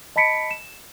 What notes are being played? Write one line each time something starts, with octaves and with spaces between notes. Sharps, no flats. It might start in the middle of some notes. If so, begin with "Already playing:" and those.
D#5 A5 B5 B6 C#7 D7
E7